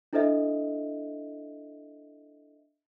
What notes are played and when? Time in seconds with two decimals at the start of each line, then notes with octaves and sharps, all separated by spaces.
0.13 D4 E4 A4 C5 D#5 E5